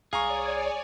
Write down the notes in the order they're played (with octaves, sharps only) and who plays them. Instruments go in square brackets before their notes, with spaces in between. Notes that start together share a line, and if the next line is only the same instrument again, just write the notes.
[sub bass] C2 [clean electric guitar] G#4 [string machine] C#5 D5 G#5 [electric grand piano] F5 A#5 C#6